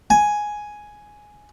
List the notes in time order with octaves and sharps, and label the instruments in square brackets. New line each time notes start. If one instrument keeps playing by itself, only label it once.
[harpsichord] G#5